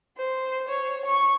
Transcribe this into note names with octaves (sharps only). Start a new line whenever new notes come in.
C5
C#5
C#6